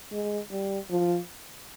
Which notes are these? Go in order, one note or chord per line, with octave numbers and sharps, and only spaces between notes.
G#3
G3
F3